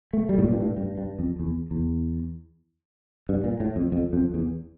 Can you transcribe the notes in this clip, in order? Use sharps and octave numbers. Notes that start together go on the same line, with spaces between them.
A3
G3
A2
A#2
G2
A2
G2
G2
F2
E2
E2
G2
A#2
A2
F2
F2
F2
E2